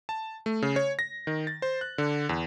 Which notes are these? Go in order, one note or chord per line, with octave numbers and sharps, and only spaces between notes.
A5
A3
C#3
C#5
A#6
D#3
A6
C5
F#6
D3
E2